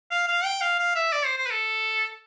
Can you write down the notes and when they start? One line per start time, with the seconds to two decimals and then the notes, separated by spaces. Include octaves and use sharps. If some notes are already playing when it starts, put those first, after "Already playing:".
0.11 F5
0.28 F5
0.45 G5
0.61 F5
0.79 F5
0.95 E5
1.13 D5
1.25 C5
1.37 C5
1.46 B4
1.51 A4